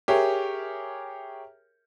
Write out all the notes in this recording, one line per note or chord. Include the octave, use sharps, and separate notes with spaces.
G4 G#4 A#4 C#5 E5